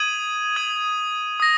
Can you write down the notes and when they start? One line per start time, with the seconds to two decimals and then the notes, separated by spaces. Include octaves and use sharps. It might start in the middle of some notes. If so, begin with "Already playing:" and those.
Already playing: D#6 G#6 D#7 F#7
0.56 D#6 G#6 D#7 F#7
1.40 D#6 A#6